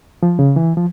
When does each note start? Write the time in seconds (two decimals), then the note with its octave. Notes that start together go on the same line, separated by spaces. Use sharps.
0.23 F3
0.39 C#3
0.56 E3
0.77 F3